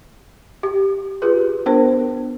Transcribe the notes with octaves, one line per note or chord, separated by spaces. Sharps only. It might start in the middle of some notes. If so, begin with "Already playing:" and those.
G4
F4 G4 G#4 B4
B3 D4 A#4 C5